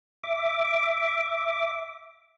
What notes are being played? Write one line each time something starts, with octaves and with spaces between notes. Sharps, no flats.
E5 D6